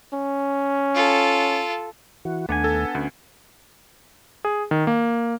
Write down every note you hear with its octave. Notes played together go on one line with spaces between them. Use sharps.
C#4
F4 A4
E3 F#4
D#2 A3 B3 D4 F#5 G#5
A4
D2 C#4
G#4
D#3
A#3